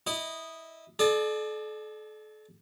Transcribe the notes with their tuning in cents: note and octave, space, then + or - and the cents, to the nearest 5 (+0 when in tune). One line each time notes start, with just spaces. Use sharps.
E4 -15 D#5 -5
A4 -40 D5 +30 A5 +0